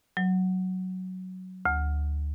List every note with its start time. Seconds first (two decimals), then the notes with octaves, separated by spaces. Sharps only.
0.17 F#3
1.65 D2